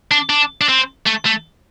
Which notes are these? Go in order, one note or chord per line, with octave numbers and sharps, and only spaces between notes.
D4
D4
D4
C4
A3
A3